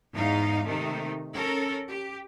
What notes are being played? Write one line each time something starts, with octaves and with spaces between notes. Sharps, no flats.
E2 G#2 D#4 F5
C3 D#3 A3 D#4
C#4 A4 A#4
G4